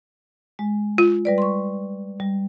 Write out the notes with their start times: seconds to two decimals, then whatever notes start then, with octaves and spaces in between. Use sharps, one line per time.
0.59 G#3
0.98 F4
1.25 G3 B4 D5
1.38 C6 C#6
2.20 G3